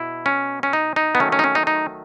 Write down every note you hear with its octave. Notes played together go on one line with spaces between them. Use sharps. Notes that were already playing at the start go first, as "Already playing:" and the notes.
Already playing: B2 E4
C#4
C#4
D#4
D#4
B3
D#3 F#3 A3 C#4
C#4
D#4
C#4
D#4
D#4